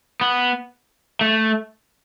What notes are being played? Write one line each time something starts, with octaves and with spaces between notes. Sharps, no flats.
B3
A3